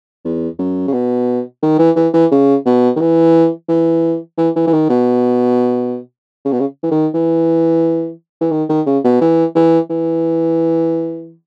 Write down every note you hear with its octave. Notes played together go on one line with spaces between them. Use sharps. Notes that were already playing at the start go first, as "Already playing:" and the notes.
E2
F#2
C#3
B2
D#3
E3
E3
E3
C#3
B2
D#3
E3
E3
E3
E3
E3
D#3
B2
C#3
B2
C#3
E3
D#3
E3
E3
D#3
D#3
C#3
B2
E3
E3
E3